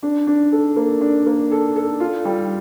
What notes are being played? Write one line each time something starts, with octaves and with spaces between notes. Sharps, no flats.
D4
D4
A4
A#3
D4
A#3
A4
A4
F4
G3